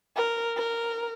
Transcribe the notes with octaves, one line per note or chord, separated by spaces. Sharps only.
A#4
A#4